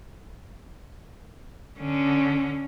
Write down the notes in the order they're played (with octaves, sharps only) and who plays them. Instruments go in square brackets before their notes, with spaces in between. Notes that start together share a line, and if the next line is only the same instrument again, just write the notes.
[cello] D3 C#4